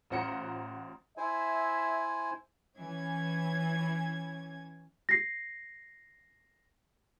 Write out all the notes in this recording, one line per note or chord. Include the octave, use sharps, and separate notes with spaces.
A1 F4 C5 F#5 A#5 C#7
E4 C5 E5 G#5
E3 C#4 G#6
A#6 C7